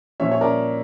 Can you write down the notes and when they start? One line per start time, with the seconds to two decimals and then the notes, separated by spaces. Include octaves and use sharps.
0.20 A#2 F3 C#5 E5
0.32 C#5
0.41 A#4 D5